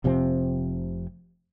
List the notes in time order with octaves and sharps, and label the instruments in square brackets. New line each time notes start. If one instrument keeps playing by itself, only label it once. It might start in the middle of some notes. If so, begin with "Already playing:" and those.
[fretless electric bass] F1 C3 F3 C4